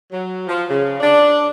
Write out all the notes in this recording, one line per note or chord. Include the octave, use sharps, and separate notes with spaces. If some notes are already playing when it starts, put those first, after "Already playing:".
F#3
F3
C#3
D4